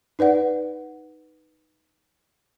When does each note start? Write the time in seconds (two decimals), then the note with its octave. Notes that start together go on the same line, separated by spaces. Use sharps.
0.19 D#4 B4 D5 F#5